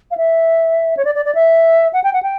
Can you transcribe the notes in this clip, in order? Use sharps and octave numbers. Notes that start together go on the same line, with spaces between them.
F5
E5
C#5
D5
D5
D5
E5
F#5
G5
F#5
G5